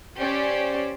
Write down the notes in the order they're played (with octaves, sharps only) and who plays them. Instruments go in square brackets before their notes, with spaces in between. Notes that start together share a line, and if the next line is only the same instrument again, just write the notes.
[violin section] C#4 G4 C5 D5